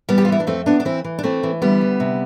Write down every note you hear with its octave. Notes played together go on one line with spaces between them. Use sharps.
E3 G3 B3
G4
F4
E3 E4
D4
F2 A3 C4
E3 B3 D4
D4
E3 C4 E4
E3
D4
E3 A3 C4
E3
D2 G3 B3
D2
C3